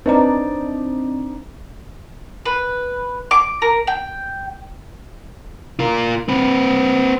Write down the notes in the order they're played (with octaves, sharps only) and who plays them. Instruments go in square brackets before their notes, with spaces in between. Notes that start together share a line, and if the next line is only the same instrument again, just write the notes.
[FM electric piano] C4 [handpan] D4 D#4 D5 [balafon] B4 D#5 A#5
[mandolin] B4
D6
A#4
G5
[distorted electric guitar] F4 A#4
C4 B4